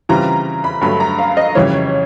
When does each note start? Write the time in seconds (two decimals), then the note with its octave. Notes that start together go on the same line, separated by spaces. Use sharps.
0.09 C#3 E3 G3 C4 F4 A#5
0.64 B5
0.81 G2 D3 F#3 A3 B5
1.00 A#5
1.19 F5
1.37 D#5
1.55 F2 C#3 E3 G3 C#5